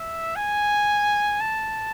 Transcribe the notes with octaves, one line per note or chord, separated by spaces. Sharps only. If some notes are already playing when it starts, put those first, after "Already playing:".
Already playing: E5
G#5
A5